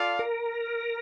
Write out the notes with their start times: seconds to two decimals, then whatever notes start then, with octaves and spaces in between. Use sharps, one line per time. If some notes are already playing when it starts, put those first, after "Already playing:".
Already playing: F4 A4 D5 F5
0.19 A#4